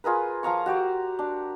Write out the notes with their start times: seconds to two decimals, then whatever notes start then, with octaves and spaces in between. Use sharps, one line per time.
0.04 F4 G#4 A#4 B4
0.43 F3 F5 A#5 C#6
0.66 F#4 G4 C5 D5
1.19 D4